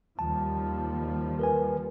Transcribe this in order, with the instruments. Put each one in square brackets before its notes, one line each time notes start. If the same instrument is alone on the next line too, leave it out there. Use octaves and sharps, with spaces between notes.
[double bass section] D#2 F3 G3 [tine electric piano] A5
[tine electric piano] A#4 B4 G#5